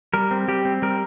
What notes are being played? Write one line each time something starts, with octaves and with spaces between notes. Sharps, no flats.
G3 A#4
C4
G3 G4
C4
G3 A#4